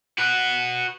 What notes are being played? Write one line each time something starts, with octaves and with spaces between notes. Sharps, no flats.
F#4 B4